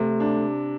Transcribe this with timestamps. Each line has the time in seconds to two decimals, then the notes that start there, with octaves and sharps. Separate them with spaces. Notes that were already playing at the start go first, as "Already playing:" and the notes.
Already playing: C3 A3
0.20 D4